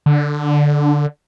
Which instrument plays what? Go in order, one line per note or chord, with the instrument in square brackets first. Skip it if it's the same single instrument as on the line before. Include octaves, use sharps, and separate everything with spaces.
[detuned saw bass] D3